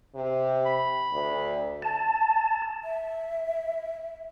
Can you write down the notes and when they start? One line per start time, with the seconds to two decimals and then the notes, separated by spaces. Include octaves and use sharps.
0.15 C3
0.66 B5
1.12 D2
1.82 A5
2.84 E5